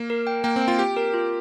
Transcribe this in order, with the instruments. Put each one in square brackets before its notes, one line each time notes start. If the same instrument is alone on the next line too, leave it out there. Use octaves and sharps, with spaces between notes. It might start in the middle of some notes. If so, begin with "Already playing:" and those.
Already playing: [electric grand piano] A#3
[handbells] A#4
G5
[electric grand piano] A#3 [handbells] G5
[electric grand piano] C4
[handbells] G5
[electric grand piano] F4
[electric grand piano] G4 [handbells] G5
[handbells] A#4
F4